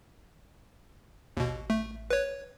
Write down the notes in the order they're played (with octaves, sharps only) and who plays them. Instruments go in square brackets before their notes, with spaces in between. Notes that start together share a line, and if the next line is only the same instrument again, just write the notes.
[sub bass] A1 [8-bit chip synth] D#2 B2
[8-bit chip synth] A3
B4 C#5